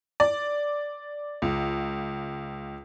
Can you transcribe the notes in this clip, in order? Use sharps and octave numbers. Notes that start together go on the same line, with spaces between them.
D5
C#2